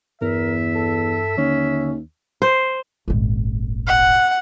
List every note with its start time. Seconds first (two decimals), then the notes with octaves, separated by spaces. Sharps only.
0.22 E2 G2 A#4 E5
0.75 A4
1.37 D#2 D3 C#4
2.42 C5
3.08 D#1 G#1
3.87 F#5